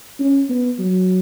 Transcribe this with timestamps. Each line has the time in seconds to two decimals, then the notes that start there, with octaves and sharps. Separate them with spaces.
0.20 C#4
0.50 B3
0.79 F#3